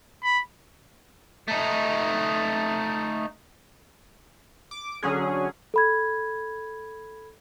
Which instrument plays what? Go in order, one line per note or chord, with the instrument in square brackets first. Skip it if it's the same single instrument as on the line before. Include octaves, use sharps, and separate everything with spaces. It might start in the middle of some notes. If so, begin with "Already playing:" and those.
[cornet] B5
[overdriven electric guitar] A3 D#4
[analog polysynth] D6
D3 F#3 C#4 G#4
[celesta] A4 B5 G#6